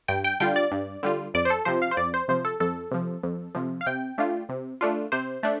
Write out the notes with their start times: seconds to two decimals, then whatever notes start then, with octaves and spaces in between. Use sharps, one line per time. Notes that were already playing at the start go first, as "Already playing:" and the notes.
0.08 G2 G5
0.24 G5
0.40 D3 G3 F4 G5
0.56 D5
0.71 G2
1.03 D3 G3 F4
1.34 F2 D5
1.45 C5
1.50 A4
1.65 C3 F3 C5
1.82 F5
1.91 C5
1.97 F2 D5
2.14 C5
2.28 C3 F3 C5
2.45 A4
2.60 F2 A4
2.92 C3 F3
3.23 F2
3.55 C3 F3
3.81 F5
3.86 C3 G5
4.18 A3 D4 F4
4.49 C3
4.81 A3 D4 F4
5.12 C3 C5
5.43 A3 D4